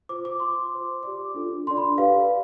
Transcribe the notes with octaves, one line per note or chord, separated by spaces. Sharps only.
F4 C5 D6
D6
F4 C5 C6
F4 C5
G4 D5 D6
D4 F4 A4
D4 A4 D5 C6
B5
G4 B4 D5 F5